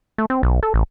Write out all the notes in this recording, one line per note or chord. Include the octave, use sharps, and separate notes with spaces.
A3
C4
B1
A4
A1